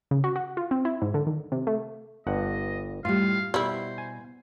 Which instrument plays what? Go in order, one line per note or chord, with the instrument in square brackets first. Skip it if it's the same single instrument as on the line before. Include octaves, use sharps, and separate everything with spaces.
[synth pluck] C#3
F#4
F#4
F4
C4
E4
G#2
D3
D#3
C3
A3
[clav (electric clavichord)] G1 G2 F#5 [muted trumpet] D#5
[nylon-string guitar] A2 G3 [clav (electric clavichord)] F4 [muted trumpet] F5
[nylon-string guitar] B2 [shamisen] G3 E4 [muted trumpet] C5
[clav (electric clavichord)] G#5